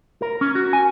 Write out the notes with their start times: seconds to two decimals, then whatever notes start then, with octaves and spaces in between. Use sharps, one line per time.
0.22 A#4
0.41 C#4
0.55 F#4
0.73 G#5